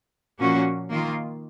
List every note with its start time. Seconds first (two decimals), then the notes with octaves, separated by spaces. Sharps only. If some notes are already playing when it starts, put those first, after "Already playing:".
0.40 A#2 F3 A#3 C#4 F#4
0.91 D#3 A#3 F4